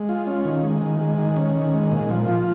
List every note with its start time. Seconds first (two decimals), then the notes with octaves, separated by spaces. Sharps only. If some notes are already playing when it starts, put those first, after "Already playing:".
Already playing: G#3
0.09 F4
0.27 C#4
0.45 D#3
0.63 G#3
0.82 D#3
1.00 G#3
1.18 D#3
1.36 C#4
1.55 D#3
1.74 G#3
1.91 A#2
2.11 F3
2.28 F4